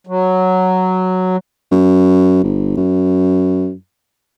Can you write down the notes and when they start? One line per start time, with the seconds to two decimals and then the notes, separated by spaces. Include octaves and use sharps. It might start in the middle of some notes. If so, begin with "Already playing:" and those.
0.07 F#3
1.71 F#2
2.44 G1
2.77 F#2